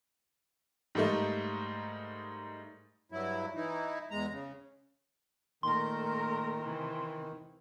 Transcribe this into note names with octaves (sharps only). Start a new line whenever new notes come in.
G#2 G3 A3 A#3 D#4
G2 F#3 E4
E3 D#4 E4
E2 G#3 A#5
C#3
A#2 D#3 A3 A#4 C6
C3 E3